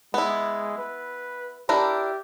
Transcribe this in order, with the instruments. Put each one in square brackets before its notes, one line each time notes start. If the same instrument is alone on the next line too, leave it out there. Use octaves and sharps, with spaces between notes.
[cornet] G#3 [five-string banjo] B3 E4
[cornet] B4
[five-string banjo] D4 E4 A#4 [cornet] G4